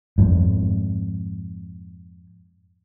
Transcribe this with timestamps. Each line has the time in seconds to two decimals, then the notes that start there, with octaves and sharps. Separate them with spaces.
0.18 F2 G#2